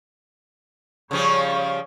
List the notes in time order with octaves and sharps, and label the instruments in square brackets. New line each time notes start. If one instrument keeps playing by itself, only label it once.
[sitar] C#3 F3 G3 [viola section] C#5